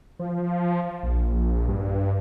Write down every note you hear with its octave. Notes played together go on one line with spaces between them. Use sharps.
F3
A#1
G2